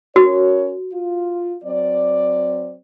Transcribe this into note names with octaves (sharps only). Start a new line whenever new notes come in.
C#4 F#4 A#4 C#5
F4
F#3 C4 D5